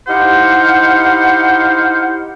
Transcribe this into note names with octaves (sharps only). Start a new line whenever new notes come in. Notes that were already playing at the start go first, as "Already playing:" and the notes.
D#4 E4 G4 C5 F5 F#5